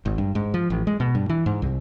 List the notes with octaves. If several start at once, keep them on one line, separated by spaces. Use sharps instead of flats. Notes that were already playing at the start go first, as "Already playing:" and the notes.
G#1
G2
G#2
F3
A1
G#3
B2
G2
E3
G#2
C2